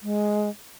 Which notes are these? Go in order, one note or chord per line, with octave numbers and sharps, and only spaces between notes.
G#3